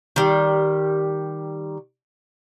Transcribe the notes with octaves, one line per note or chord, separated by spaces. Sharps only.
D#3 G3